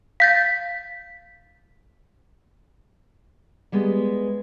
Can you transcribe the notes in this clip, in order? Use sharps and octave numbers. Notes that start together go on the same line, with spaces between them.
F5 G6 A6 B6
G3 G#3 B3